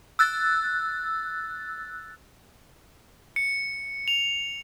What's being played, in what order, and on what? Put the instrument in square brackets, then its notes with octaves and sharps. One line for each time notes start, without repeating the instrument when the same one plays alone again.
[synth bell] E6 F#6 A6
[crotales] C#7
F7